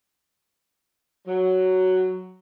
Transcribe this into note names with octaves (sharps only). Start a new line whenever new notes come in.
F#3